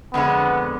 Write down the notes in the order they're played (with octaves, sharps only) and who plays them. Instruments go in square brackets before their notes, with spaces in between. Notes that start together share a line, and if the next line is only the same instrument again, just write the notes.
[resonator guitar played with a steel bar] F2 D3 G#3 [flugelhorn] B3